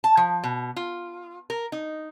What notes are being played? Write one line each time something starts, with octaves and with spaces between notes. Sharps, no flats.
A5
F3
B2
F4
A#4
D#4